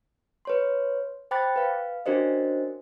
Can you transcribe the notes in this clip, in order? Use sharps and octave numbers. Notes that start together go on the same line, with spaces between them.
B4 C#5 C6
C5 G5 B5 D6 F#6 A6
B4 F5
C#4 D4 F#4 A#4 C5 D#5